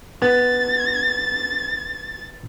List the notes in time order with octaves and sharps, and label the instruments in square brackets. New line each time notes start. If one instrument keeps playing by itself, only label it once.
[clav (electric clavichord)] B3 [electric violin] A6